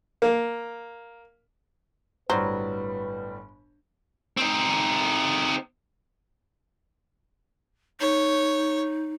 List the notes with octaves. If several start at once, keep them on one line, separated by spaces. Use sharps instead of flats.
A#3
G1 A2 F#3 G3 B4 C5
C4 D#4
D#4 C#5